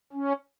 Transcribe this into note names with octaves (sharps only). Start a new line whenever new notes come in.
C#4